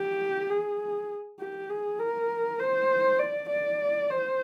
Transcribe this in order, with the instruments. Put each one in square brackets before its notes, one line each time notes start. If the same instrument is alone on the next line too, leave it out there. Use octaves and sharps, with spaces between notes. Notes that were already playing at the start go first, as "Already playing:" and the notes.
Already playing: [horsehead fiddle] G4
G#4
G4
G#4
A#4
C5
D5
D5
C5